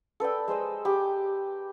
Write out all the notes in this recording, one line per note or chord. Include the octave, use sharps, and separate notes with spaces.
A4 B4 D5 G5
G#3 C5 D#5 E6
G4 B5